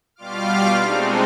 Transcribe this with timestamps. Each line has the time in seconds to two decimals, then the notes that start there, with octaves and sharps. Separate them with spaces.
0.16 B2 G3 F4 F5 D6 F6
0.78 G#3 A3 C4 D4 D#4